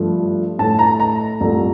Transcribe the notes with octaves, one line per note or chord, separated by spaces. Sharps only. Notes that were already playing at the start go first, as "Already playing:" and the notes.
Already playing: G2 F3 A3
A2 A3 A5
A#5
A#5
C2 A#2 A3